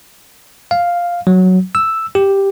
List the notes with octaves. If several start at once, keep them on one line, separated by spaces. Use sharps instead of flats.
F5
F#3
E6
G4